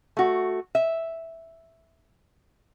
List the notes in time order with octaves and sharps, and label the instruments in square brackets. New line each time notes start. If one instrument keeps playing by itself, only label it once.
[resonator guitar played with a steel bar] A3 F#4
E5